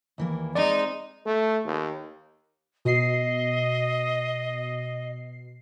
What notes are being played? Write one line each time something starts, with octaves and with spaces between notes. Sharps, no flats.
D#2 E3 A#3
G#3 C4 D#4 D5
A3
D#2
B2 D#5 C7